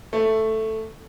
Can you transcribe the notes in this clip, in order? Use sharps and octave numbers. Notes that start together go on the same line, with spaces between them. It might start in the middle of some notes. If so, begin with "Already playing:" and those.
A3